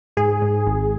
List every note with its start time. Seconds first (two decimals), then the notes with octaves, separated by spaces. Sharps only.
0.17 G#2 G#4
0.42 G#2
0.67 G#1